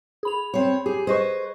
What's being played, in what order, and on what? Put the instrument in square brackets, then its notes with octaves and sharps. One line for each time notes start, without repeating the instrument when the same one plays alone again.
[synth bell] G#4 B5 F7
[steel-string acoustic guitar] C4 C#5
[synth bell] G4 [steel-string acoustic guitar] G#4
[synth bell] G#4 D#5 C#6 [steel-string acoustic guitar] B4 C5